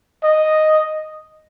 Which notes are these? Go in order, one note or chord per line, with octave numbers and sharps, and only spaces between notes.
D#5